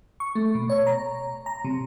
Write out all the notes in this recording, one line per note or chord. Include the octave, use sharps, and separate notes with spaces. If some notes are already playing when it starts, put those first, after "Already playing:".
C#6
A3
B2
C#5
A#5
A#5
C3